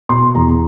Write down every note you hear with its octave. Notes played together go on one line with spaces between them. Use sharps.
B2 C6
E2 A#5